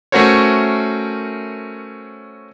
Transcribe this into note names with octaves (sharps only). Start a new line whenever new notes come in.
A3 C#4 F#4 A#4 C5 C#5